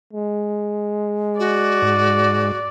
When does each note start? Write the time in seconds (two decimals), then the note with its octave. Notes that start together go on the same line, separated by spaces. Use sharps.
0.13 G#3
1.39 F#4 D5
1.82 G#2